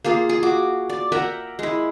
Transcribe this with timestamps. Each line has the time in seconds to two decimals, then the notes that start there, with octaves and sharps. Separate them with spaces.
0.04 A#3 F4 G#4
0.29 G#4
0.43 F#4 D6
0.90 D5
1.12 A#4 E5 F#5 G5
1.59 G#3 E4